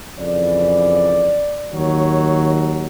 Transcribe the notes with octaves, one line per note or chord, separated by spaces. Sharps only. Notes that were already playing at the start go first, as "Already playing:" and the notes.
F2 C#3 E3 D5
D#2 D#3 F#3 C#5